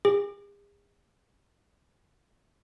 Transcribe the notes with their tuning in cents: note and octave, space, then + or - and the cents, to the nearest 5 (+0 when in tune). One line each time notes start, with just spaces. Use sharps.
G#4 -40